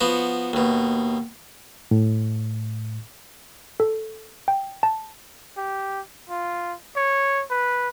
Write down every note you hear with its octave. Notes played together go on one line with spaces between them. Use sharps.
F3 B3 F#4
D#2 B2
A2
A4
G5
A5
G4
F4
C#5
B4